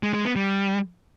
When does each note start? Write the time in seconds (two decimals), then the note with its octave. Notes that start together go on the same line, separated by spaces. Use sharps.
0.03 G#3
0.14 G#3
0.25 B3
0.36 G3